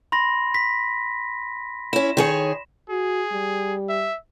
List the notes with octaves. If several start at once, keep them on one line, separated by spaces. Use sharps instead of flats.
B5 C6 A#6
B6
C#4 E4 E7
D#3 G#4 C#5
F#4 G#4
G3
E5